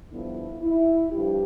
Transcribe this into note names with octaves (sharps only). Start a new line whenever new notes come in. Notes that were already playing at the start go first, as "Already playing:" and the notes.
G2 D3 F3 B3 E4
E4
G2 D3 F3 G4